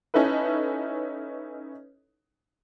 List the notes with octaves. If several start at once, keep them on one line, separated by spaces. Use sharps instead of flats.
C#4 D#4 E4 A4 B4